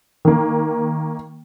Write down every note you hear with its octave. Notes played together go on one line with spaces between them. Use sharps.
D#3 A#3